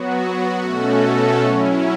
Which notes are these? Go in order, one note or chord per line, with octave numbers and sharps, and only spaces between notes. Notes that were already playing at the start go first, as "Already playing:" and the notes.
Already playing: F#3 B3 F#4
B2 A3 C#4 F#4 A4
F#3 C#4 E4